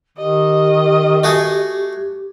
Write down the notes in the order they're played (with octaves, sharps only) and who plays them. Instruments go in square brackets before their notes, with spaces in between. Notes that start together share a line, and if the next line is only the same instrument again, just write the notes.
[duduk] D#3 [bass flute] G4 [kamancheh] D#5
[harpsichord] A3 F#4 G#4